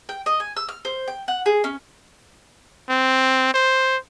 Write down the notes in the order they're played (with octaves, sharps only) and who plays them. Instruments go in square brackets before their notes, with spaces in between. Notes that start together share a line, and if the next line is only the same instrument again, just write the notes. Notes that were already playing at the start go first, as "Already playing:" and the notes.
[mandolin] G5
D#5
G#5
E6
F6
C5
G5
F#5
G#4
C#4
[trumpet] C4
C5